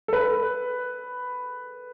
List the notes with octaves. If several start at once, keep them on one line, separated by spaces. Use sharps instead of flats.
A4
B4